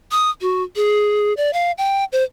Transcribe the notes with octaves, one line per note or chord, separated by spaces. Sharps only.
D#6
F#4
G#4
D5
F5
G5
C5